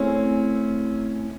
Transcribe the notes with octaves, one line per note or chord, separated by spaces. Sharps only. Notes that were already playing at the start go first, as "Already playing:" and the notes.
Already playing: A3 C4 C#4 E4 G#4